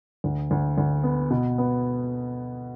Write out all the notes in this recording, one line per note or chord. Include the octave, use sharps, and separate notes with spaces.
D2
D2
D2
B3
B2
B3